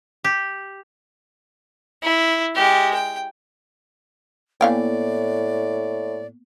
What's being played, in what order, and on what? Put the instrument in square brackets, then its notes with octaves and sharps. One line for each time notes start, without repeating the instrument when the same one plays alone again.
[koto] G4
[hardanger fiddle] E4
G#3 G4
G5
[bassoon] A2 [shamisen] E3 F5 G5 [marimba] A#3 B3 [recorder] D5